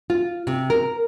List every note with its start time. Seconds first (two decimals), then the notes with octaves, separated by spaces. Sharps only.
0.10 F4
0.47 C3
0.70 A#4